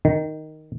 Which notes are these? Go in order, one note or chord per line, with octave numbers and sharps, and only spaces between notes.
D#3